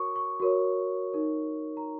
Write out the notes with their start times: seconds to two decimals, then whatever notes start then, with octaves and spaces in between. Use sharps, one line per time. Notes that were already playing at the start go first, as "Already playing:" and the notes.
Already playing: F#4 A#4 C#5 C#6 D#6
0.16 C#6
0.40 F#4 A#4 C#5
1.12 D#4 A#4 C#5
1.77 A#5